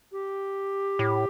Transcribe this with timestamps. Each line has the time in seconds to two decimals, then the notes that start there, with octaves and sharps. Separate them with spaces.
0.12 G4
0.99 A2